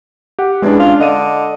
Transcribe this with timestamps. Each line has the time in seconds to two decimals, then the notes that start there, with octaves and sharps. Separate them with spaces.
0.39 G4 F#5
0.62 E2 G#3 C#4 D4
0.79 F4
1.00 D3 D#5 D#7